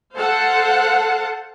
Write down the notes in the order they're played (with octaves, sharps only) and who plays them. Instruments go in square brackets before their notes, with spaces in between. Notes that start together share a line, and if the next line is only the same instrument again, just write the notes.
[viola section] A4 C5 F5 F#5 A5